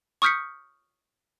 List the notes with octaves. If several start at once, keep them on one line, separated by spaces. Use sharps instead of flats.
C#6 D#6 F6 G6 B6 C#7